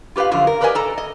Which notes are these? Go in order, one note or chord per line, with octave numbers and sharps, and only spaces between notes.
F4 G4 B4 D#5 F5
F#2 D3 F3 F4
A#4
G4 A#4 B4 D5 D#5 G#5
A4 A#5
D#5